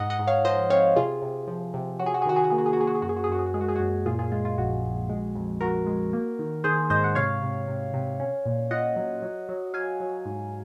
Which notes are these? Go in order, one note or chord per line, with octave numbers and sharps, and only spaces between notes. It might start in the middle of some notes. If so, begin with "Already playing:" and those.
Already playing: G#2 D#5 F#5
D#5 F#5
G#2
C#5 F5
F3 C5 D#5
C4 C#5 F5
C3 F4 G#4
C3
F3
C3
F#3 F#4
G#4
F#4
G#4
D#3 F#4
G#4
F#4
A#3 G#4
F#4
G#4
F#4
A#3 G#4
F#4
G#4
F#2 F#4
G#4
F#4
G#4
F#2 F#4
G#4
F#4
G#3 G#4
F#4
G#4
F#2 F#4
A#2 F4 G#4
F4 G#4
G#3 F4
F4
A#1 F#4
A#1
G#3
F2
F2 F#4 A#4
G#3
A#3
D#3
D#3 G#4 C5
G#2 C5 D#5
F#5
C3 C#5 F5
C3
C3
C3
C#4
A#2
F4 D#5 F#5
F#3
F#3
F#3
F#3 F5 G#5
F#3
G#2